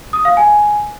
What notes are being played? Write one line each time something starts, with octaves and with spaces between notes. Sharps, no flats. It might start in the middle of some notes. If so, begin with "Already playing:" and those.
D#6
F5
G#5